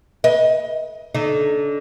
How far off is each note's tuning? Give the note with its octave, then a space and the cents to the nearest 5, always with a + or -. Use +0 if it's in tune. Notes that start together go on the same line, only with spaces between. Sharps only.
B4 -30 D#5 +20
D3 -25 D#4 -35